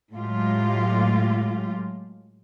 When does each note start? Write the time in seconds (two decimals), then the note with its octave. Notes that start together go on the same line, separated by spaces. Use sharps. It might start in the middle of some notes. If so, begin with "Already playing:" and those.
0.13 A2 F#3 G#3 F4 G4